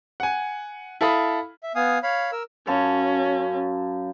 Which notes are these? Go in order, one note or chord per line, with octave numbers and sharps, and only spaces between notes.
F#5 G#5
E4 A4 F5 B5 D#6
E5
B3 F5 G#5 D#6
C#5 F5 B5
A#4 E6
F#2 C#4 F5 A5